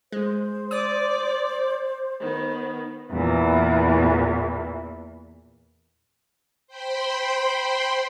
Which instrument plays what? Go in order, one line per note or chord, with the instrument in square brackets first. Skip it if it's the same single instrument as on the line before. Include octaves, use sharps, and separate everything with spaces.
[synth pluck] G#3 [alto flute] C5
[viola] D5 D6 [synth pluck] D#6
[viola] D#3 B3
[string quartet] E2 A#2 E3
[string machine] C5 G5 B5 C6